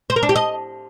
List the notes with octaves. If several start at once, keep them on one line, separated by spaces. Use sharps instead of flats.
C5
A#4
D4
G4
D#5